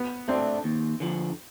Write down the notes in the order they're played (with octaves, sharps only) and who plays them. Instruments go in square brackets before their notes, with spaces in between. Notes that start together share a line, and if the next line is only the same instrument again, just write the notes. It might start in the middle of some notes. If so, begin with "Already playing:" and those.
Already playing: [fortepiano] B3
[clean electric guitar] A3 D4 [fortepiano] C4
[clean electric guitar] D#2
D3 F3